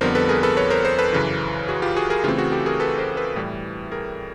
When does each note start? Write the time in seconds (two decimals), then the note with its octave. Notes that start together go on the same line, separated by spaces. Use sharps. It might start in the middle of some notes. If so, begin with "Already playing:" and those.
0.01 F2 D3 G3 B3 A#4 C5
0.15 A4 B4
0.29 G#4 A#4
0.43 A4 B4
0.57 B4 C#5
0.70 A#4 C5
0.85 A#4 C5
0.99 A4 B4
1.13 F#2 C#3 E3
1.68 F#4 G#4
1.82 F4 G4
1.96 F#4 G#4
2.10 G#4 A#4
2.24 C#3 E3 A3 C4 F4 G4
2.38 F#4 G#4
2.52 G4 A4
2.66 G#4 A#4
2.80 A4 B4
2.99 A#4 C5
3.17 A4 B4
3.36 A2 E3 G3
3.91 G#4 A#4